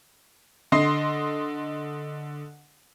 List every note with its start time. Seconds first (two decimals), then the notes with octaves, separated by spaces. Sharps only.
0.72 D3 D#5 C6 C7